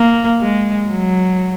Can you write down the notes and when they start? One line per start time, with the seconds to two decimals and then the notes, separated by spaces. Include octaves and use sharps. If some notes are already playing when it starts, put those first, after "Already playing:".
Already playing: A#3
0.41 G#3
0.89 F#3